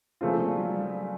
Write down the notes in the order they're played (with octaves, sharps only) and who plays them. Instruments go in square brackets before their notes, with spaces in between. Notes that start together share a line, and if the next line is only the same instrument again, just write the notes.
[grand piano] C#3 F3 A3 C4 F4 [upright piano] A#3
[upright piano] G3
F#3
G3